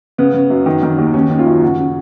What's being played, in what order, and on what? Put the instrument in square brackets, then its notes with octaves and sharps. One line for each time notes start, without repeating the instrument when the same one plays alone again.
[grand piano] C#3 B3
C#3
F#2
D#3
D#3
D#2
D#3 C#4
D#3
F4
F#2
C#3 F#4
C#3